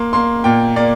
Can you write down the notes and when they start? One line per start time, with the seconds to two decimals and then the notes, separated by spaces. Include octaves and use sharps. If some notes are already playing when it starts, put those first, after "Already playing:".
Already playing: A#3 C6
0.13 A#3 C6
0.44 A#2 G5
0.76 A#3 D5